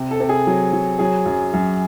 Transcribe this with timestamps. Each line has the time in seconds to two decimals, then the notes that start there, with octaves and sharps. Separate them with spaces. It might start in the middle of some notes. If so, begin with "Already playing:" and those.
Already playing: C3
0.11 A4
0.20 C3
0.29 G#4
0.47 F#3
0.73 F#3
0.99 F#3 G#4
1.26 F#2
1.53 F#2